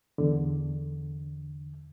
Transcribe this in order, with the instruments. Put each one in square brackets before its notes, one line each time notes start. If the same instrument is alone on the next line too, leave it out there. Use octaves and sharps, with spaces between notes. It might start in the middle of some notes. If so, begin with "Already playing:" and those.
[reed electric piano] E2 D3